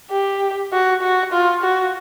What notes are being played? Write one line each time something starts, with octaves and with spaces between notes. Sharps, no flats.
G4
F#4
F#4
F4
F#4